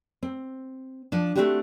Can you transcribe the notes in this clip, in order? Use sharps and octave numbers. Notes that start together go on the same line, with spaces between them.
C4
F3 D4
A3 A#3 C4 D4 F#4 G4